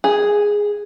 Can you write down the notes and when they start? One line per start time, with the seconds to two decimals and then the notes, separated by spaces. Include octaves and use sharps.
0.04 G#4